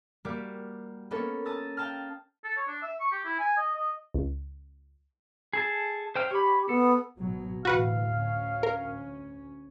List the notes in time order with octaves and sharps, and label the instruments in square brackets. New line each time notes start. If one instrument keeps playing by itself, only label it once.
[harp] G3 A#3 F#4 G4
A#3 B3 C#4 A4 A#4
A5 A#5 D#6 E6 A6
F5 G5 A5 A#5 F6
[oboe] A4
C#5
D4
E5
C#6
G4
E4
G#5
D#5
D#5
[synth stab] C#2
[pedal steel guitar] G#4 A4 A5
C5 G5 F6
[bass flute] G4 [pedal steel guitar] C#5 B5
[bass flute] B3 [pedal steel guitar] A4
[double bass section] G#1 B2 F#3
[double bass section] D2 A2 E3 [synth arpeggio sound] F#4 B4 F#5 [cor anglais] F5
[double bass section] D2 C#4
[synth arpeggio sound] A#4